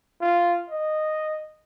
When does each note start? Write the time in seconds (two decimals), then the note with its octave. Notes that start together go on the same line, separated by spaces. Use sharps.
0.21 F4
0.70 D#5